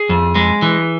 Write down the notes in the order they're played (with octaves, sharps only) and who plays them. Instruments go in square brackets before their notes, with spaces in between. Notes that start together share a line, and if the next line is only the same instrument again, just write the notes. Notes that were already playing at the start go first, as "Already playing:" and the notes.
Already playing: [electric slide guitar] G#4
F2
G#3
E3